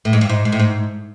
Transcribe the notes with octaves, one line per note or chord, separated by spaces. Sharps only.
A2
G#2
G2
G#2
G#2
A2
G#2